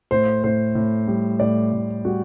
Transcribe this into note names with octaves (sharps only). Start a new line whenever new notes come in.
A2 C5
A2 C5
A2
G3
A2 D5
A2
G3 F#4